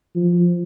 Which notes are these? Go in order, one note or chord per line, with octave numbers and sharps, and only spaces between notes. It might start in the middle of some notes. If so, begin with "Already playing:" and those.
F3